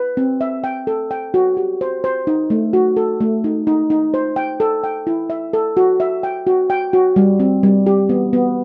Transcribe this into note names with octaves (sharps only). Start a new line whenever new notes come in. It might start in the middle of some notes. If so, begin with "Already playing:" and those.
Already playing: B4
C4
E5
G5
A4
G5
F#4
G4
C5
C5
D#4
A3
F#4
A4
A3
D#4
D#4
D#4
C5
G5
A4
G5
E4
E5
A4
F#4
E5
G5
F#4
G5
F#4
G3
C4
G3
G4
B3
B3